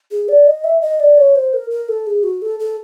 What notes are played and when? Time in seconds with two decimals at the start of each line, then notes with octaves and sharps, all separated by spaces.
0.11 G#4
0.28 D5
0.47 D#5
0.64 E5
0.81 D#5
1.00 D5
1.17 C#5
1.35 C5
1.53 A#4
1.71 A#4
1.89 A4
2.07 G#4
2.23 F#4
2.42 A4
2.60 A4